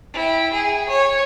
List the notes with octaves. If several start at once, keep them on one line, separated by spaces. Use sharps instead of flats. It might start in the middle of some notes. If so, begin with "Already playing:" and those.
E4 G5
G#4
C#5